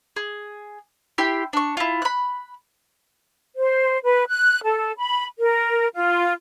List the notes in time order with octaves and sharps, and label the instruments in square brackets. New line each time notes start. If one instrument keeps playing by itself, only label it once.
[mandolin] G#4
E4 G4 G5 C6
D4 C#6
E4 F4
B5 F#6
[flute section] C5
B4
F#6
A4
B5
A#4
F4